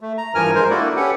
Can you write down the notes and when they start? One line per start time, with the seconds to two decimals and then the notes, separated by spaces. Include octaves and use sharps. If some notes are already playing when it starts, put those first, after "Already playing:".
0.01 A3
0.18 A#5
0.35 G2 E3 F3 A#4 G#5 F6
0.55 G#3 A#4 C5
0.70 A#3 D4 E4 F#4 A4 D5
0.96 C#4 G4 A4 B4 F#5